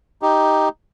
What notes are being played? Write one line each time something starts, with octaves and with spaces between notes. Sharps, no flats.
D#4 G4